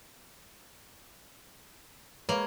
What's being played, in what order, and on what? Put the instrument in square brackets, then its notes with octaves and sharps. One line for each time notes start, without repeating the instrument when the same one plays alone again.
[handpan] G#3 B4 C#5 [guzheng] A#3